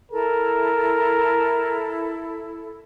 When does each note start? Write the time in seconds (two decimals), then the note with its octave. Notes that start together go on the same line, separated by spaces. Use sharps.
0.12 E4 A4 A#4